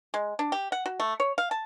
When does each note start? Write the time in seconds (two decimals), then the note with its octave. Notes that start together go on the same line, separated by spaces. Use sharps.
0.14 G#3
0.39 D4
0.52 G4
0.72 F#5
0.86 F#4
1.00 A3
1.20 C#5
1.38 F5
1.51 A5